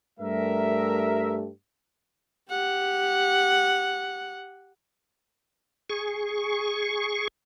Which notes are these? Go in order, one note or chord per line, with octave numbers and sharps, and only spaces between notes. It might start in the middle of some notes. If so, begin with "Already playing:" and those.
G2 G3 A3 A#4 E5
G4 F#5
G#4 C#6